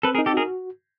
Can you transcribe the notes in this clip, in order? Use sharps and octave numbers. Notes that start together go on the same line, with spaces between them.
C4 A4 B4
G#4 A#4
D#4
G4 A4
F#4 G#4 A#4